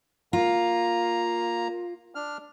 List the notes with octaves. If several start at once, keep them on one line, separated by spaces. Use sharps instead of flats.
A#3 F4 A#5
D4 F6